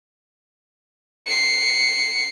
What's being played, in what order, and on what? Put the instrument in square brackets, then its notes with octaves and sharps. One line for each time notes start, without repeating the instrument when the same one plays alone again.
[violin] C7 C#7